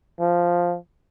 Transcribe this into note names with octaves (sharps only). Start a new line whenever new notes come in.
F3